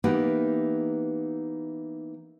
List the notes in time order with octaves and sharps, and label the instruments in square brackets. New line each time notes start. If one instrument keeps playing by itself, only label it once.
[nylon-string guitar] E3 A#3 B3 D#4 G4